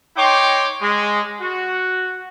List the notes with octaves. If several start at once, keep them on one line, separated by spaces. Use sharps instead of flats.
D#4 C#5 G5 C6 D6
G#3
F#4